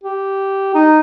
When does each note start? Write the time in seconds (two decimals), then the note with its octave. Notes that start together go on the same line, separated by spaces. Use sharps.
0.04 G4
0.75 D#4